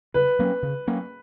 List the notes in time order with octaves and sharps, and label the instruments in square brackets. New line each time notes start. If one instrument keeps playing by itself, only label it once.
[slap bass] C#3 [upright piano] B4
[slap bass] F#3 A#3 C#4
C#3
F#3 A#3 C#4